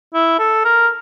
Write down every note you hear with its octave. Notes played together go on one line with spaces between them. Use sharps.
E4
A4
A#4